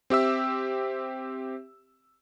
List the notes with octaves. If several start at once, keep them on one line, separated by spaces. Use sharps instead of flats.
C4 G4 E5 E6